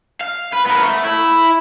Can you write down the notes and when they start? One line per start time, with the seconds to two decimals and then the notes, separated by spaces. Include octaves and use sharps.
0.21 F5
0.53 B4
0.66 B3 A#4
0.82 A3
1.04 E4